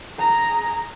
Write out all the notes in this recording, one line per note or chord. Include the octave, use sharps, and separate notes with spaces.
G#4 A#5